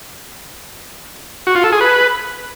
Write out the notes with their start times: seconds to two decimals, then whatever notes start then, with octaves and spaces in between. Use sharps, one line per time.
1.47 F#4
1.55 F4
1.64 A4
1.72 G#4
1.81 B4